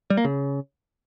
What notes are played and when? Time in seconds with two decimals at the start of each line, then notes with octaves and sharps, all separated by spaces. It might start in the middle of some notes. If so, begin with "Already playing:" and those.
0.10 G3
0.17 A#3
0.25 C#3